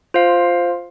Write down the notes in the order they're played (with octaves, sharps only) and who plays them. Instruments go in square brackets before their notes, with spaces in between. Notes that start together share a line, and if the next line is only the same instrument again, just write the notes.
[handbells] F4 C5 F5